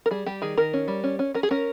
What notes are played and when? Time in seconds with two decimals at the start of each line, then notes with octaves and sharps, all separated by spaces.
0.06 A#4
0.11 G3 G#4
0.26 G3 G4
0.42 D#3 G#4
0.57 D#3 A#4
0.73 C#4
0.88 G3
1.03 C#4
1.19 C#4
1.34 C#4 A#4
1.43 G#4
1.51 C#4 A#4